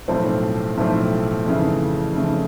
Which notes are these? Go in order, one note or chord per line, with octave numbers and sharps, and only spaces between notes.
B1 A2 F3 A3 C4
B1 A2 F3 A3 C4
F2 C#3 E3 A3
F2 C#3 E3 A3